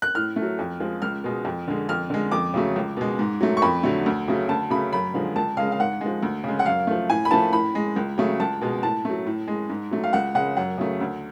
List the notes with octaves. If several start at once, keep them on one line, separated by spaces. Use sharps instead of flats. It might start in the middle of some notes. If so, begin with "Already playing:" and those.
F#6
A2 F6
A3
F#3
F2
F3 G#3
C#2 F6
B2 G#3
F2
D3 G#3
F2 F6
D3 G#3
F2 D6
C#3 F#3 A3
C#2
B2 G#3
G#2
F#3 A3
C#6
F2 B5
D3 F#3 A3
D2
C#3 F#3 A3
D2 A5
C#3 F#3 A3 B5
F#2 B5
D3 F3 G#3
C#2 A5
C#3 G#3 F5
F5
G#2 F#5
F3 G#3
D2
C#3 G#3
F#5
F#2 F5
F3 A3
A2 G#5
B5
F3 A3 A5
A2 B5
G#3
C#2
C#3 F#3 A3
C#2 A5
B2 G#3
A2 A5
F#3 A3
A2
G#3
G#2
F#3 A3
F5
C#2 F#5
C#3 G#3 F#5
F#2 F#5
C#3 F#3 A3
D2